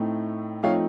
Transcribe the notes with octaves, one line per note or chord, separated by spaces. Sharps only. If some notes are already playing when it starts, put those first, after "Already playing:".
Already playing: A2 A3 C4 D#4
F3 A3 C4 D#4 C#5 F5